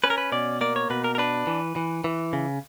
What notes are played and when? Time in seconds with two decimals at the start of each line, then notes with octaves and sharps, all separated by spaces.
0.04 C#4 B4
0.10 A#4
0.18 B4
0.32 B2 D5
0.61 A#3 D5
0.76 C#5
0.90 B2 B4
1.04 A#4
1.15 A#4
1.18 D4 B4
1.47 E3
1.76 E3
2.04 E3
2.33 C#3